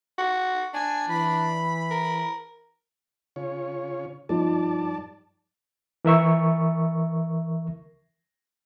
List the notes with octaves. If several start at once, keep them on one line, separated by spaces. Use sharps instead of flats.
F#4
D4 G#5
E3 B5
A#4
C#3 F4 C#5
G2 F3 D#4 D5 A5
E3 A#4 E5 C#6